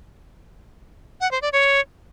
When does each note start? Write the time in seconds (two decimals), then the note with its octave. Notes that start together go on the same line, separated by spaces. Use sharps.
1.21 F#5
1.31 C5
1.42 D5
1.53 C#5